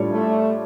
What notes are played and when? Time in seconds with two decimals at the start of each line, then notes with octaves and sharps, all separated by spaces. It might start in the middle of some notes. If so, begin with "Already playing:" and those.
Already playing: A2 G3 D4 F4 C#5
0.11 A3